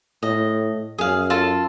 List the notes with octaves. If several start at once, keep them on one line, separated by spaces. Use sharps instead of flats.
A2 D#5
F#2 G#4 F5
F4 A4 A5